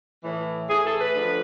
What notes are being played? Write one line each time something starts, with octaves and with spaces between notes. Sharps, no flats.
A2 E3
A2 E3 G#4
A4
B4
D2 D3 F3